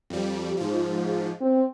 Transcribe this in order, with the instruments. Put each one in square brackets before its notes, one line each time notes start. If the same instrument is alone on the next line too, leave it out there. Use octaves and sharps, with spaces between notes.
[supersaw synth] F2 G3
G#2 F3
[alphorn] C4